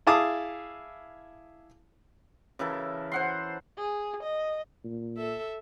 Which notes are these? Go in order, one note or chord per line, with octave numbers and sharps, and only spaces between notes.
E4 G#4 F5 A5 D6 D#6
C#3 E3 A4 A#4
C5 F#5 C6
G#4
D#5
A#2
A4 E5